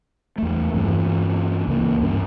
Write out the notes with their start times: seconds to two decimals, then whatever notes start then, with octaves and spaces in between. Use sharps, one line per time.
0.38 E2 A3
0.74 G2 E3 C#4
1.67 C#2 E3 F#3 A#3
2.02 G2 C#4